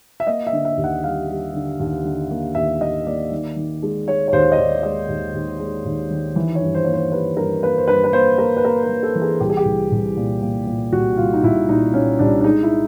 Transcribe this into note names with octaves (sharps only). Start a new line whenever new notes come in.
E5
A#3 D#5
E5
D3
E5
D#2
F#5
G3 F5
G3
D3
D#2
D3
A#3
D#2 E5
A#3 D#5
A#3 D5
D#3
D#3
G#3
G#3 C#5
C#5
D#2 C5
D#5
D#2 D5
D5
G#3 D#5
D#2
D#2
G#3
D#2
D#3
E3
C#5
G2
C5
A#3 C#5
C5
G3 B4
G2 A#4
A#3 B4
C5
G2 B4
B4
A#3 C5
A#3 A#4
B4
A#3 A#4
B4
A#3
A4
E3
G#4
C2 G4
G#4
G4
C2
C2
A#2
A#2
A#2
C2 F#4
C2 F4
D#4
C2 E4
A#2 D#4
A#2 C#4
C2 D4
D4
G#3 D#4
E4